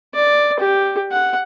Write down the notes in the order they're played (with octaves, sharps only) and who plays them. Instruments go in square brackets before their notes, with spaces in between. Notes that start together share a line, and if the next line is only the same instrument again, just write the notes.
[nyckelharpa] D5
G4
F#5